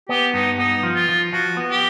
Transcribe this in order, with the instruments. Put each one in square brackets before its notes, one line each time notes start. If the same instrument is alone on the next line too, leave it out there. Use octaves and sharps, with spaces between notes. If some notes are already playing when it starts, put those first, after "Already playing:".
[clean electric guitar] B3 [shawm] G4
[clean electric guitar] G2 [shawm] D#4
[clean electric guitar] B3 [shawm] D#4
[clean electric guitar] F3
[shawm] F4
[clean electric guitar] F3
[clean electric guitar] F3 [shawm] F#4
[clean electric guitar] B3
[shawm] G4